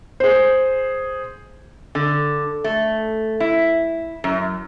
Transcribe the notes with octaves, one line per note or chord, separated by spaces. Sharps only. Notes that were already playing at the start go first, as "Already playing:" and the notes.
G#4 C5
D3
A3
E4
F#2